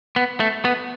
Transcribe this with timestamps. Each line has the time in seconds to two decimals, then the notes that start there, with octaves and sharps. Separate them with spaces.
0.16 B3
0.40 A3
0.65 B3